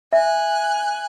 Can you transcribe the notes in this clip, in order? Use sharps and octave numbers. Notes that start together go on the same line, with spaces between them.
E5 G#5 F#6